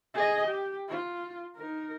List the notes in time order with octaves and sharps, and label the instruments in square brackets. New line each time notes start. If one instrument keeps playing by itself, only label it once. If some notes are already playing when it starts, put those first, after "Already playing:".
[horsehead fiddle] G#4 D#5
G4
F4
D#4 A#4